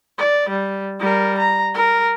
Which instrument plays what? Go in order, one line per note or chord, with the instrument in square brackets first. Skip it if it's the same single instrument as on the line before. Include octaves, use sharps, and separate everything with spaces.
[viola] D5
G3
G3 A#4
A#5
A#4